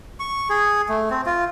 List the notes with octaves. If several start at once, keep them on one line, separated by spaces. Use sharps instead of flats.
C#6
G#4
A3
C4
F4